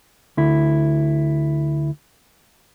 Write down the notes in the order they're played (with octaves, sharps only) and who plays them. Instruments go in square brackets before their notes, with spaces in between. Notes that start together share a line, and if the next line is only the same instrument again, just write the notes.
[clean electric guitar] D2 E4